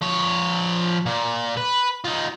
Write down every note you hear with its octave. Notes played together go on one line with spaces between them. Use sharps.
F3 C#5
A#2
B4
D#4 F4